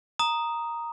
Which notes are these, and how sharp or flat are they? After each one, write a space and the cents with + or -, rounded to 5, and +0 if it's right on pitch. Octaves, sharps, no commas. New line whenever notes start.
A#5 +0 D#6 +0